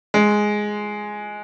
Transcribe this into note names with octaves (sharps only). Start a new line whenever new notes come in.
G#3